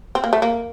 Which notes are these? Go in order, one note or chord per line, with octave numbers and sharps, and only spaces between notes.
C4
A#3
A3
A#3